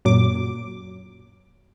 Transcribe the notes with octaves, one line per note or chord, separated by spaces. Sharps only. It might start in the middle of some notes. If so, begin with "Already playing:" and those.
F#2 A#2 F#3 D6